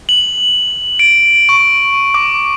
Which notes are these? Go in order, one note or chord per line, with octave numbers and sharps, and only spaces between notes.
F#7
D7
C#6
D6